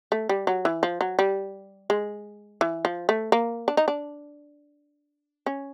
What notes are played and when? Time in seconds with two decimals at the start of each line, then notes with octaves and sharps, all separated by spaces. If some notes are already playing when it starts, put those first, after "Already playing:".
0.12 A3
0.29 G3
0.47 F#3
0.65 E3
0.83 F3
1.01 F#3
1.19 G3
1.90 G#3
2.61 E3
2.85 F3
3.09 A3
3.32 A#3
3.68 D4
3.77 D#4
3.88 D4
5.46 C#4